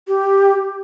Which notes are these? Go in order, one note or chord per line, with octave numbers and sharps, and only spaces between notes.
G4